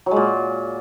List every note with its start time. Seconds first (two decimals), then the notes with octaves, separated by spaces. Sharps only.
0.06 F#3
0.11 G#3
0.16 A#2